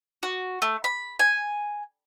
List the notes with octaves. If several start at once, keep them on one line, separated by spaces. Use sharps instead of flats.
F#4
A3
B5
G#5